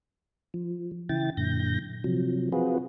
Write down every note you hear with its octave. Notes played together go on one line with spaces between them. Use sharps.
F3
C#3 E3 E4 G5 A6
F#2 A#2 D3 G6 A#6
C3 F3 F#3
C4 F4 F#4 G#4 B4